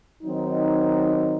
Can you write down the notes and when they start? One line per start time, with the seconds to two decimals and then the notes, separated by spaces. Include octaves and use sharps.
0.23 D#3 F#3 C4 D#4